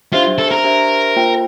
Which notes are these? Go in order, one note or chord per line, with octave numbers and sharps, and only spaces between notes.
D4 F4 G4 C5 E5
A4
A#4
D4 G4 C5 E5
A#3 F4 C5 G5